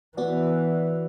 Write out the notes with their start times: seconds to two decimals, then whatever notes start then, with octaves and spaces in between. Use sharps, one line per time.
0.17 E3 B3 F#4 D5